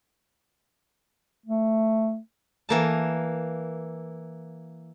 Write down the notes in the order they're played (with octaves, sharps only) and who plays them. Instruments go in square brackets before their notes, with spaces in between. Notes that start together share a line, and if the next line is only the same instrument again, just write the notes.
[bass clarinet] A3
[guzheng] E3 A#3 A5